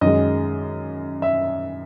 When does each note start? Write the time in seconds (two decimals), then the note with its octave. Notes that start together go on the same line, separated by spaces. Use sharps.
0.01 F#2 D#3 G#3 D#5
1.22 E5